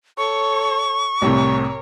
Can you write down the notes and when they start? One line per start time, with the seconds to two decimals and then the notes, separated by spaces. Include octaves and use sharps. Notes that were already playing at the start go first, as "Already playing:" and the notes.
0.18 A4 C#5 C#6
1.22 C2 A2 C3 A#4 C#5